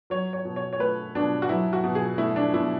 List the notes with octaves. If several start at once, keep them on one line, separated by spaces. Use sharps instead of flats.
F#3 C#5
C#5
B2
C#5
C#5
A3 B4
B2 D4
F#4
F#3 E4
F#4
B2
G#4
A3 E4
D4
B2 E4